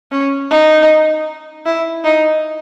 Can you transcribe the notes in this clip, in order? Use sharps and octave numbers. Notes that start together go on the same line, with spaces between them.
C#4
D#4
E4
D#4